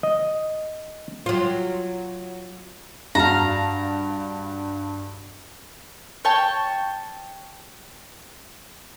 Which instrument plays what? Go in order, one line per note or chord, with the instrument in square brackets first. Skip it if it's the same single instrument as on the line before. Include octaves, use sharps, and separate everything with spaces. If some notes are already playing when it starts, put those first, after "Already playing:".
[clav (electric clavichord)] D#5
[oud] F#3 F4
[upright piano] G2 F#4 A5 [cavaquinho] F5 A#5
[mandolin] C#5 G5 A5